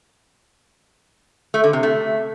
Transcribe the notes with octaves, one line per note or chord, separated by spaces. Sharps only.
A3
D3
C3
A3